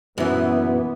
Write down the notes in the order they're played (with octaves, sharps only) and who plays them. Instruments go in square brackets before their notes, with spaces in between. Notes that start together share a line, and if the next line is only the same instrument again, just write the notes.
[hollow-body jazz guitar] F#2 E3 [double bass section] A#2 B3